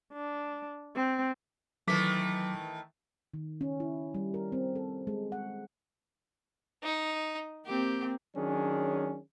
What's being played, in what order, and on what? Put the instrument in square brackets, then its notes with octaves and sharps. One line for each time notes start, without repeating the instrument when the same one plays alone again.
[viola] D4
C4
[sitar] D#3 E3 A3 [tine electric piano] F#3 D6 B6
[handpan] D#3
C#4
E4
G3
A#4
C4
A4
G#3
F#5
[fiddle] D#4
[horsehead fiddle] A#3 C4 [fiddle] G4
[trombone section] D#3 F#3 C#4 D4 G#4